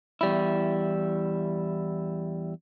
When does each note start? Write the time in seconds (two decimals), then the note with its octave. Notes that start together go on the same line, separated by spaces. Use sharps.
0.21 E2 G3 E4